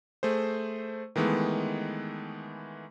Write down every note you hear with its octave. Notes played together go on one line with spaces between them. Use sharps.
A3 G#4 C5
D#3 E3 G#3 A3 B3